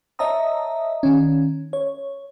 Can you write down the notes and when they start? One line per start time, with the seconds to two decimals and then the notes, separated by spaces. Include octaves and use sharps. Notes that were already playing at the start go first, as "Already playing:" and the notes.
0.19 C#5 D#5 E5 A5 A#5 D#6
1.03 D#3 C#4
1.73 C#5